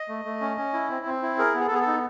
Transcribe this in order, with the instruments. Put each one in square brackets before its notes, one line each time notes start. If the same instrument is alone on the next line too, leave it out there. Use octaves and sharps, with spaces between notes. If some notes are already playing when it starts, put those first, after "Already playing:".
Already playing: [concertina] D#5
A3
A3
C#4
C#4
E4
C4
C4
E4
G#4 A#4
B3
G#4
A4
B3 G#4
A4
D#4